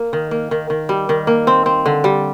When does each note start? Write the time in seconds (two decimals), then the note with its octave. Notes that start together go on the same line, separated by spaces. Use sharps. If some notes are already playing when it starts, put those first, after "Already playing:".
Already playing: A#3
0.13 D#3
0.31 A#3
0.51 D#3
0.70 D#3
0.89 G3
1.09 D#3
1.27 A#3
1.47 C4
1.66 C4
1.86 D3
2.04 G3